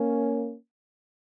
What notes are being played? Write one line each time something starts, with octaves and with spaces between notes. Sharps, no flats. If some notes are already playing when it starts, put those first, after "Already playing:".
Already playing: A#3 C#4